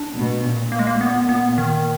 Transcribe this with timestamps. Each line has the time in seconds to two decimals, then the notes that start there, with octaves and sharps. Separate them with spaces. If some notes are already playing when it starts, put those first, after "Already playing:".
Already playing: D4
0.15 B2
0.43 A#2
0.72 A#3
0.79 G#3
0.87 A#3
1.01 B3
1.29 B3
1.58 D#3